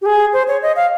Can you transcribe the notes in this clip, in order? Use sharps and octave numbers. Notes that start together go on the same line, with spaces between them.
G4
G#4
C5
C#5
D#5
F5